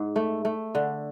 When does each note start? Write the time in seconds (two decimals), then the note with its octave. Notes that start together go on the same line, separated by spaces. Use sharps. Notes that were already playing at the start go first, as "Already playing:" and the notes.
Already playing: G#2
0.16 A3
0.45 A3
0.75 D3